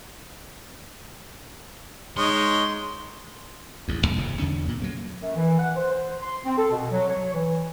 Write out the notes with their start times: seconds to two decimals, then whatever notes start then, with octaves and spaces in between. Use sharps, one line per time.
2.17 G#3 D#4 C#5 C6
3.88 A1 E2
4.02 D1 G1
4.17 D#1 F2 C#3
4.39 E2 D3 C#4
4.68 A#2
4.80 F#3 G3 A#3
5.21 F#2
5.35 E3
5.59 F#5
5.76 C5
5.91 C5
6.22 C6
6.44 C4
6.57 A4
6.71 B2
6.91 F#3
7.09 C#5
7.33 E3